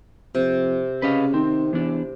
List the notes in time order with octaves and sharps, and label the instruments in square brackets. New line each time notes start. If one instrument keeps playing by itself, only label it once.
[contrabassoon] F2 [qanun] C3
[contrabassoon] C#3 [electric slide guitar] B4 D#5 F5
[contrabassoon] D#3 [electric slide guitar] C4
[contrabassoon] E2 [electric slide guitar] E3 D4